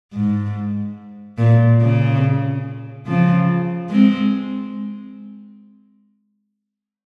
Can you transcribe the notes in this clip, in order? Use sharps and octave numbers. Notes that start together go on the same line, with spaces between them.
G#2
A#2
C#3
C#3 F3
G#3 C4